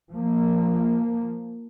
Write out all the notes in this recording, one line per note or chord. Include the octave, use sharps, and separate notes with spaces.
F3 A#3